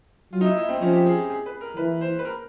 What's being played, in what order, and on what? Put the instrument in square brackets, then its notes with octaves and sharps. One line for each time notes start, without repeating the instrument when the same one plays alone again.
[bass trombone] F#3 [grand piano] F4
[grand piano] D#4
E4
E4
C4
[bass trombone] F3 [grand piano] C#4
[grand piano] G4
G#4
G#4
B4
A#4
[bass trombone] E3 [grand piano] B4
[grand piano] C5
B4
A#4